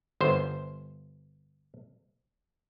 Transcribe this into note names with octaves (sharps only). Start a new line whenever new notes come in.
G1 C5